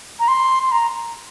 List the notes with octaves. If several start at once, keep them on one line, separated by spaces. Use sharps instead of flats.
A#5
C6
C6
A#5